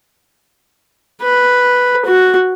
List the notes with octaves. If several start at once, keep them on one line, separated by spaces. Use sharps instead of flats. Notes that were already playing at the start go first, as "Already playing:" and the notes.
B4
F#4